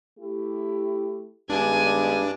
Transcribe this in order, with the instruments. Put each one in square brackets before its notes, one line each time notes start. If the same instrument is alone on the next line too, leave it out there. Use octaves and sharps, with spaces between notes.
[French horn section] A3 E4 G4
[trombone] G2 [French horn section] D#3 G#3 B3 [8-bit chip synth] D4 [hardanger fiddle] G#5